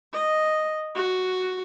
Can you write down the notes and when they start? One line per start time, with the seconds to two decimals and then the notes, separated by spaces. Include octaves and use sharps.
0.13 D#5
0.95 F#4